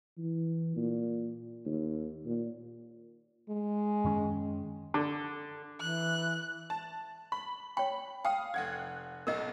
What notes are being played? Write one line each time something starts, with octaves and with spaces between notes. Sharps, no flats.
E3
A#2
D#2
A#2
G#3
F#2 D#3 C#4
D3
E3 F#6
A5
B5
C#5 G5 B5
F5 G5 D#6
F1 F#5 G#6
B1 B2 A#4 D#5